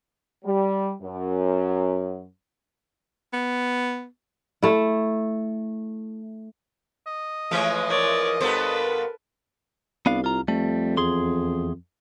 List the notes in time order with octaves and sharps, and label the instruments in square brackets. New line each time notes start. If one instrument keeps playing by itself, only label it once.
[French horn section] G3
F#2
[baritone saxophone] B3
[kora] A3 E4
[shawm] D#5
[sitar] E3 F3 G#3 [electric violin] A3 C#5
[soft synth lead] A#4 [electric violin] C#5 D5
[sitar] G2 B3 C5 [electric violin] A4 B4
[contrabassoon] C2 [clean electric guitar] B3 D4 F5
[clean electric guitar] F4 A#5
[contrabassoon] F2 [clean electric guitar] G3 A3
[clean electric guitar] E2 G#4 C6